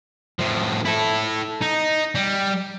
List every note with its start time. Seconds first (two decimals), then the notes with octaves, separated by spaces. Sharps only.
0.39 A2 F3
0.85 E4 A4
1.61 D#4
2.15 G3